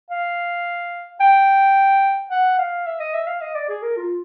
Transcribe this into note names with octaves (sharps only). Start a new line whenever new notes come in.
F5
G5
F#5
F5
E5
D#5
E5
F5
D#5
D5
G#4
A#4
F4